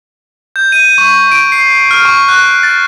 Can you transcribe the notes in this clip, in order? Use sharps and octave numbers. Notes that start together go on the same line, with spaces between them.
G6
D#7
C#6
D7
C7
F6
C#6
F#6
A6